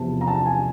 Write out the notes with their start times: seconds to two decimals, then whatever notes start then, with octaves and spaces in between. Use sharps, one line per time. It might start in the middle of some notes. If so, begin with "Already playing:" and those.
Already playing: E2 C3 F3 A5
0.21 A#5
0.27 A5
0.46 G#5